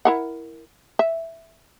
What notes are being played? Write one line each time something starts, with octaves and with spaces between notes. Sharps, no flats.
E4 A#4 F#5
E5